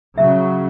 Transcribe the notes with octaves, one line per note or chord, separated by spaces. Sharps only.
C#3 F#3 E5